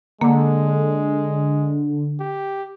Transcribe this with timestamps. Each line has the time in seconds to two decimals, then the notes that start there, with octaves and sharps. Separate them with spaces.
0.21 D3 G#3 A#3
2.20 G4